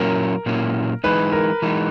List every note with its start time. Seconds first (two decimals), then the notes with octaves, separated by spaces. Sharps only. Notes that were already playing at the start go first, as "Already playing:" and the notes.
Already playing: A#2 F#3 A#3 C#4 E4 A#4
0.46 A#2 F#3 A#3 C#4 E4
1.04 E3 G#3 D#4 B4
1.32 A#4
1.62 E3 G#3 D#4